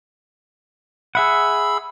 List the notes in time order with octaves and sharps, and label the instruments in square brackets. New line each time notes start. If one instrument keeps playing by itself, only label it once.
[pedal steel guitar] G#4 E5 F#5 [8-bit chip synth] B5 E6